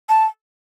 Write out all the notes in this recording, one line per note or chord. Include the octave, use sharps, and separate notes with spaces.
A5